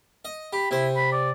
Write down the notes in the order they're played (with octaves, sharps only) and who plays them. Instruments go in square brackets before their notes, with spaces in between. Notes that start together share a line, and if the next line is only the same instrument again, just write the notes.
[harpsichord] D#5
[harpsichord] G4 [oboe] B5
[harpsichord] C3 C5 [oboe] E4
[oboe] B5
D5